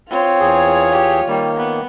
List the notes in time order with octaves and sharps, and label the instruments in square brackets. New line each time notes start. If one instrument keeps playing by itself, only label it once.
[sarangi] C4 [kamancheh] F4 C#5
[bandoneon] E2 G#4
[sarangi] G4
[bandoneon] D#3 A#3 [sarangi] G3
[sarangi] B3